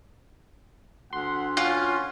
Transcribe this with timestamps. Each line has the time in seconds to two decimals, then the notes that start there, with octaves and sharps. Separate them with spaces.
1.13 D2 F#5 C6
1.57 C#4 F4 F#5